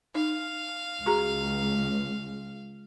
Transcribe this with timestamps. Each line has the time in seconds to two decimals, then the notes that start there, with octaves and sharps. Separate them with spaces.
0.15 D#4 F5
1.06 C#2 F#4 G#4 A#5